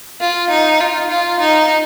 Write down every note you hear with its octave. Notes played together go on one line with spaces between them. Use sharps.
F4
D#4
F4
F4
D#4